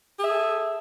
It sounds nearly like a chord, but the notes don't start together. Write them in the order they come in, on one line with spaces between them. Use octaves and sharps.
G#4 E5 A4